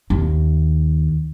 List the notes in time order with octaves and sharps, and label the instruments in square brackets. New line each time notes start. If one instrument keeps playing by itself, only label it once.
[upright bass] D#2